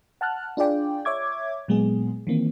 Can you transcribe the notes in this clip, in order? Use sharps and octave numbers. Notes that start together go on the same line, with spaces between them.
F#5 A5 F6 F#6
D4 F4 G#4 D5 G5
C#5 E5 D6 G#6
A#2 F#3 G#3 B3 G#4
D#3 E3 A#3 C4